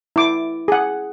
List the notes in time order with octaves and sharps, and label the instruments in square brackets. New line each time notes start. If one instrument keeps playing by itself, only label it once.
[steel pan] E4 D6
G#4 F#5